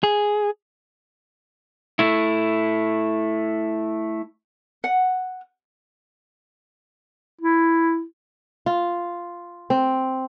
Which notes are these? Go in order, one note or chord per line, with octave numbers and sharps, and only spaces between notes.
G#4
A3 E4
F#5
E4
F4
C4